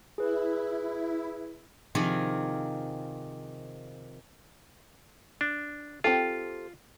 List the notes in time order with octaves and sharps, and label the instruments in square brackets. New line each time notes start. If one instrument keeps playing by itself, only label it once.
[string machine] E4 [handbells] G#4 B4
[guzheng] C3 D#3 F3 C4 G#4
[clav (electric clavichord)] D4
[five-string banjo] C4 G4 A4 [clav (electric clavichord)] F4